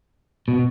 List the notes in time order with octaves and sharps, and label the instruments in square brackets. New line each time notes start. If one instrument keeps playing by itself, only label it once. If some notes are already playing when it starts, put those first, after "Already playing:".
[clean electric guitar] B2